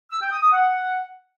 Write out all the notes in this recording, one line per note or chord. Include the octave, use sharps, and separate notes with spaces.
E6
G5
D#6
D#6
F#5